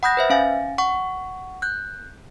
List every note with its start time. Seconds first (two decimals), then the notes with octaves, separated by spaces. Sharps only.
0.03 F#5 B5 D#6 F#6 G6 A#6
0.17 B4 C5 E5
0.30 C#4 F5 G#5 A6
0.78 F#5 C#6
1.62 F#6 G6